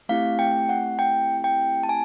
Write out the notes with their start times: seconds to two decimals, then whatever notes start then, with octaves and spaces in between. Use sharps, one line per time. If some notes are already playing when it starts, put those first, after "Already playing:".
0.09 A3 C4 E4 G4 F5
0.39 G5
0.69 F#5
0.99 G5
1.44 G5
1.83 A5
1.89 G#5